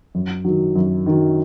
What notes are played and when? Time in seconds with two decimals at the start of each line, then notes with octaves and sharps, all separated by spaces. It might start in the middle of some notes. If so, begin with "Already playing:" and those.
0.15 F#2
0.45 D#3 F#3
0.76 F#2
1.06 D#3 F#3